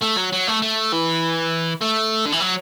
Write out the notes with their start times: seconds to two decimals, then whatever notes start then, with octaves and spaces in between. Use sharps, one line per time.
0.02 A3
0.17 F#3
0.33 F#3
0.48 A3
0.62 A3
0.92 E3
1.82 A3
2.26 D3
2.33 E3
2.41 F#3